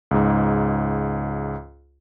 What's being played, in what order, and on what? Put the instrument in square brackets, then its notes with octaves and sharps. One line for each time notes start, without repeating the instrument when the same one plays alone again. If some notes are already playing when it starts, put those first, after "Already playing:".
[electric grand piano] C#2 G#2